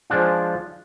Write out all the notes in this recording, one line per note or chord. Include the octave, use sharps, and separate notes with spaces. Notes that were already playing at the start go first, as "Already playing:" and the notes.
F3 G#3 D4 F4